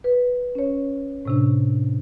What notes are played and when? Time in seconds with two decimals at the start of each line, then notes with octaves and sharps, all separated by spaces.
0.04 B4
0.55 C#4 C#5
1.25 A2 C3 D4